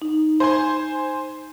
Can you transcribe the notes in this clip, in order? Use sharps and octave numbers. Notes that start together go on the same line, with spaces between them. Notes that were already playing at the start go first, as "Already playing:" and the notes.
D#4
C5 G#5 C6